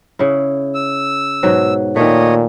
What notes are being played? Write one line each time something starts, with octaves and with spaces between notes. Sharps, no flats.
C#3 E4
E6
G#2 B2 F#3
A#2 D#3 A3 C#5 D#5